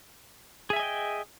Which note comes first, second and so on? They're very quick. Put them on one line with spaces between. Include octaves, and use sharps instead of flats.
G#4 E5 G#5 D#5 G5